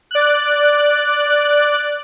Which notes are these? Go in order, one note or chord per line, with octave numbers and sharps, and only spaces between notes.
D5 F#6